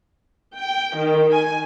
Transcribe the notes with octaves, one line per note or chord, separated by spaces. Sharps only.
G5
D#3
G#5